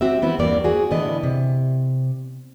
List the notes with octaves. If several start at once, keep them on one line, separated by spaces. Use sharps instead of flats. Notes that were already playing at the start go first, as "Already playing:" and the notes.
C4 F#4 G4 E5
E3 B3 C4 E4
E2 G2 A#3 B3 G4 D5
C4 F#4 G#4
A2 D3 E3 B3 D5 D#5
C3